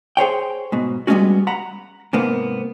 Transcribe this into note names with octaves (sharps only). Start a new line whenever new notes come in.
G#4 C5 C#5 G5
G#2 B2
G3 G#3 A#3 B3 C#4 F#4
F#5 A#5 B5
G#2 C3 A#3 B3